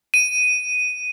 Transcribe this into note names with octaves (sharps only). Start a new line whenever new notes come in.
D#7